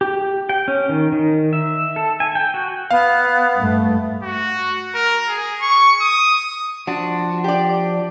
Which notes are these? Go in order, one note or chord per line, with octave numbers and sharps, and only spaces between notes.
G4
G5
C#4
D#3
D#3
E5
A4
G#5
G5
F#4
B3 F5
G2 A3
F#4
A#4
G#4
C#6
D#6
F3 D4 F#4
G4 D5